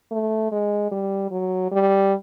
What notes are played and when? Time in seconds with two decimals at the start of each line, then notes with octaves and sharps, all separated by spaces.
0.11 A3
0.52 G#3
0.92 G3
1.31 F#3
1.72 G3